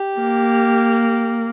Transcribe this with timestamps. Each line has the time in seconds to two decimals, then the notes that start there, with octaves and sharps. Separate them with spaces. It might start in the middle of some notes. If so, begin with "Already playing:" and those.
Already playing: G4
0.20 A#3